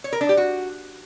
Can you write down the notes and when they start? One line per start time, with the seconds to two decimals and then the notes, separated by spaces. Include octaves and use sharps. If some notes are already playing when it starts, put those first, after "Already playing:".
0.04 C#5
0.13 A#4
0.21 D4
0.29 G4
0.37 F#4